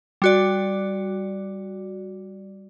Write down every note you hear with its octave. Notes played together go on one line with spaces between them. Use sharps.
G3 F#4 D5